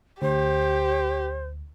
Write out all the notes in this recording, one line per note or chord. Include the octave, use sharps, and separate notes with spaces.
D2 G4 C5